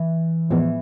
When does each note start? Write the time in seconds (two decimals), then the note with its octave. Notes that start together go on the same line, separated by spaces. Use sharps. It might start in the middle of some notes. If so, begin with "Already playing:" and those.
Already playing: E3
0.50 A2 E3 F3 G#3 B3